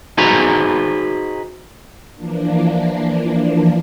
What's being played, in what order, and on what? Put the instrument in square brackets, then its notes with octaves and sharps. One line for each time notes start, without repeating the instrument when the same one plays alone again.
[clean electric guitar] D#4 F#4 G#4 B4 C5 A#5
[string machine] E3 F3 A#3 D4